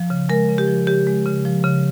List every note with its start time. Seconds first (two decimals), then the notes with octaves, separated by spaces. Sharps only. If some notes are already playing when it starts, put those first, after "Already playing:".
Already playing: F3
0.10 C#3
0.29 G#3 A#4
0.49 C#3
0.58 G4
0.68 F3
0.87 C#3 G4
1.07 G#3
1.26 C#3
1.45 F3
1.64 C#3